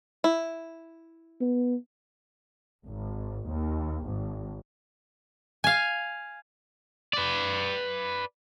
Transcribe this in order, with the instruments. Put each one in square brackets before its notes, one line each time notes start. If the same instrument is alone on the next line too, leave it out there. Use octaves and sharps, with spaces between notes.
[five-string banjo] E4
[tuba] B3
[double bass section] G#1
D#2
G#1
[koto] F5 G#5
[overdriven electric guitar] B4 D5